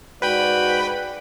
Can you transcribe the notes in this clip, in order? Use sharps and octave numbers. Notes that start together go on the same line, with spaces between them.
G#2 F#4 B4 D5 G5 B5